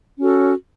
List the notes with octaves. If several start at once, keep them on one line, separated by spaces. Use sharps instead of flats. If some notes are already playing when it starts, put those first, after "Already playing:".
C#4 F#4 A4